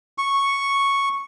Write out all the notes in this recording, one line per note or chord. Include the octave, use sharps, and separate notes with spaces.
C#6